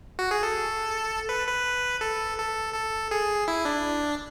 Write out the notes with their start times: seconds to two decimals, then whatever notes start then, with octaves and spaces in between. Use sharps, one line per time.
0.19 F#4
0.31 G#4
0.43 A4
1.29 B4
1.47 B4
2.01 A4
2.38 A4
2.74 A4
3.11 G#4
3.48 E4
3.65 D4